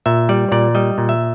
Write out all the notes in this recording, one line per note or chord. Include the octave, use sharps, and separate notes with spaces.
A#2 E5
G3 D5
A#2 D5
G3 D#5
A#2
E5